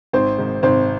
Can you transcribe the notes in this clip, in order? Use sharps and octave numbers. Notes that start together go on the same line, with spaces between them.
G#1 C4 C5
G#2 D#3
G#1 C4 C5